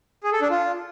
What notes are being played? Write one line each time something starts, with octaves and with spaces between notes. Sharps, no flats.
G#4
A4
D4
F4